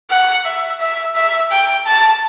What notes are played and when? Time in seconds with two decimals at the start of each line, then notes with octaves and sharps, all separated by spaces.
0.11 F#5
0.46 E5
0.80 E5
1.16 E5
1.52 G5
1.87 A5